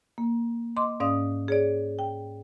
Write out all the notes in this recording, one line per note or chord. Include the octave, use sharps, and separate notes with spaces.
A#3
D#5 C6 D6
G#2 C#4 D5 F5 D#6
G#4 C#5 D5
G5